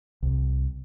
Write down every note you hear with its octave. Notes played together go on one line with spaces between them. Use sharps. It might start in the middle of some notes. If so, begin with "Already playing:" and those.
C2